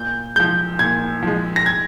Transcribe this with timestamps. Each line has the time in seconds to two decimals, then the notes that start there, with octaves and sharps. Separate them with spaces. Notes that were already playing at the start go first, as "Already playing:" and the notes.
Already playing: A#2 G6
0.36 F3 G#3 G6
0.79 A#2 G#6
1.23 F3 G#3
1.56 A#6
1.66 G#6